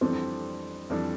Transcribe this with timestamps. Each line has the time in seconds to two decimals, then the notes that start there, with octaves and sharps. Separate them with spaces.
0.01 F2 E3 G3 C4 D4 A4
0.90 F2 E3 G3 D4 A4